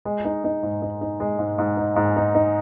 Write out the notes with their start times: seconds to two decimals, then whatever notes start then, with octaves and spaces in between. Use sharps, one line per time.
0.05 G#3
0.25 D#4
0.44 D#4
0.63 G#2
0.82 D#4
1.01 D#4
1.20 G#3
1.39 G#2
1.58 G#2
1.77 D#4
1.96 G#2
2.16 D#4
2.35 D#4